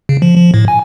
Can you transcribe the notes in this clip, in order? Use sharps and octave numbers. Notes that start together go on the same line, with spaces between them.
C#3
F3
F3
A2
G#5